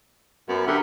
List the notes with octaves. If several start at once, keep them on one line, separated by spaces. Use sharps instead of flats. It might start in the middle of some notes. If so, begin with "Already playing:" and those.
F#2 B3
D3 G4 A#4 E5